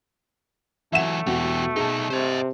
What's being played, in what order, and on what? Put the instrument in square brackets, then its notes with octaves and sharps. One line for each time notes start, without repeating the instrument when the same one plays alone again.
[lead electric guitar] E3 F#3 [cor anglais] A3 [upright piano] E5 F#5 E7
[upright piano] E1 B2 F#4 [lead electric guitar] E3 G4
[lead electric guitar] B2 D#4 [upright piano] G#4 A5
[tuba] C3 [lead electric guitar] C5 D#5